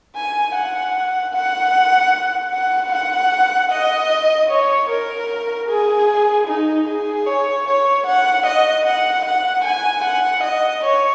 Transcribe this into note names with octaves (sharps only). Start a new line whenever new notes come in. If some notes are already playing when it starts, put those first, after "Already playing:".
G#5
F#5
F#5
F#5
F#5
D#5
C#5
A#4
G#4
D#4
G#4
C#5
C#5
F#5
D#5
F#5
F#5
G#5
F#5
D#5
C#5